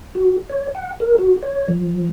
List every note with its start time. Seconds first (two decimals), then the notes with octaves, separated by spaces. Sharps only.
0.15 F#4
0.50 C#5
0.75 F#5
1.00 A#4
1.18 F#4
1.43 C#5
1.68 F3